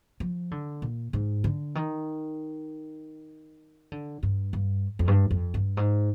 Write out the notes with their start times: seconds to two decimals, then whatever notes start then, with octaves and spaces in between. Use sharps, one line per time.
0.20 F3
0.51 D3
0.82 A#2
1.13 G#2
1.44 D3
1.75 D#3
3.92 D3
4.23 G2
4.53 G2
4.99 F2
5.08 G2
5.31 F2
5.54 G2
5.77 G#2